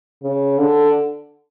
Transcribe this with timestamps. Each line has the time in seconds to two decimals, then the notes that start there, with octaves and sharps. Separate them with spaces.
0.23 C#3
0.58 D3